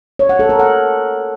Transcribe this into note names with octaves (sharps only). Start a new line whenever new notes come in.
C#5
F#5
A4
A#4
F#5